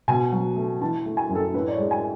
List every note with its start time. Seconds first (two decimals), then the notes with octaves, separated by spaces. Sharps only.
0.08 B2 G#5
0.32 F#3
0.56 A3
0.82 E3 A5
1.06 A3
1.17 G#5
1.29 F#2
1.35 A4
1.54 A2 B4
1.68 D5
1.73 C#5
1.78 G#3
1.91 G#5